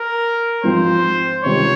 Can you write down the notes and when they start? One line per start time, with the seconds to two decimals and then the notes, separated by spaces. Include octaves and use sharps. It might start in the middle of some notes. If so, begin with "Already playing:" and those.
Already playing: A#4
0.63 G#2 F3 C4 F4 C5
1.44 C#2 C3 D#3 C#5